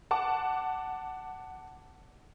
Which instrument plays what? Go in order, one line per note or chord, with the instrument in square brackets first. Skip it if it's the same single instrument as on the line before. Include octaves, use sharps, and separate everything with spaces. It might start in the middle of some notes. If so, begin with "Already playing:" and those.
[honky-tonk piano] F#5 A5 D6